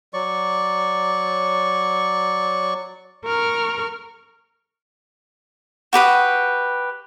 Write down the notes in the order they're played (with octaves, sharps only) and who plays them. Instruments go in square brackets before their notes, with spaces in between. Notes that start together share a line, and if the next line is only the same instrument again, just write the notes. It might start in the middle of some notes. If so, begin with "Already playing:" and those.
[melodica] F#3 D5 C#6
[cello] A#4 [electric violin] C#6 F6
[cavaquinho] F#4 G4 B4 D#6